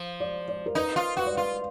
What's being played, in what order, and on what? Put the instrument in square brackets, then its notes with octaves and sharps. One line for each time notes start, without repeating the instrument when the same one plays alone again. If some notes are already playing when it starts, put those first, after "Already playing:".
Already playing: [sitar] F3
[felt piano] D5
D5
A#4
[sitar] D#4 [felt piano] B4
[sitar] F4
[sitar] F#4 [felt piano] B4
[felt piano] D5
[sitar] F4 [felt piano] B4